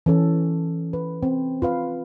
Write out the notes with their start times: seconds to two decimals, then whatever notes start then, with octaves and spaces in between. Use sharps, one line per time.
0.06 E3 C#4 A4
0.93 B4
1.23 C4
1.62 F4 B4 F5